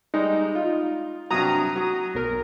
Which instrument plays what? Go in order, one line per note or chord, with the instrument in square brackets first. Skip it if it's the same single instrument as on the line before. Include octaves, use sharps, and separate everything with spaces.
[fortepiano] G3 G#3 [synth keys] D#4
[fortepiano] F4
[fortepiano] G2 C3 F#3 [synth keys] A#5 D#6
[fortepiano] F#3
[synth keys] B1 A#4